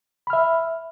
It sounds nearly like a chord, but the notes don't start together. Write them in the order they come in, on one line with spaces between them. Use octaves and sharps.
B5 F6 E5